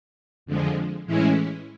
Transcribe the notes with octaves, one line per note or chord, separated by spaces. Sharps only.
F2 D3 F3 G#3
A2 E3 G#3 C#4 E4